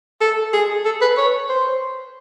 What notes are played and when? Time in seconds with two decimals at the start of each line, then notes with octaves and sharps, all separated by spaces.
0.21 A4
0.53 G#4
0.85 A4
1.02 B4
1.17 C#5
1.49 C5